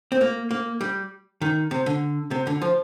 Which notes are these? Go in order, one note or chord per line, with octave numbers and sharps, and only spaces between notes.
C4
A#3
A#3
G3
D#3
C3
D3
C3
D3
F3